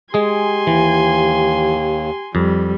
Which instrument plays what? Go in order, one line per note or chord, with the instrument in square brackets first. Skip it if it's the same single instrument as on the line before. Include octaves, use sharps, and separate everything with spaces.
[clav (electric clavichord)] G#3 G#4 [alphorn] G4 [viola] G#5 C6
[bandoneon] D#2 [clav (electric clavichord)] E3
[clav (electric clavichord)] F2 [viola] G3